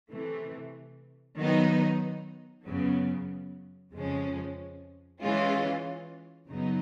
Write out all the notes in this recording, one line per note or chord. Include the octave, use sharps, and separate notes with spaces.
C3 E3 A3
D#3 F#3 B3 D#4
F#2 C#3 F#3 B3
F2 C#3 F3 G#3 C#4
E3 G#3 C#4 F4
F#2 C#3 F#3 B3 D#4